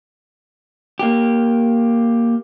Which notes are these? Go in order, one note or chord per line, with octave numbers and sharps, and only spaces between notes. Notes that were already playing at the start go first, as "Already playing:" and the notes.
A#3 G4